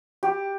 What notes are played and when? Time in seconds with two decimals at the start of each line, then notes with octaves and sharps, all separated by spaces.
0.23 G4